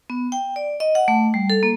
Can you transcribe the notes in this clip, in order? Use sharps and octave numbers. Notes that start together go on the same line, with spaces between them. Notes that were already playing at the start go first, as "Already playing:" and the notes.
B3
G5
D5
D#5
F#5
A3
G3
A4
A#3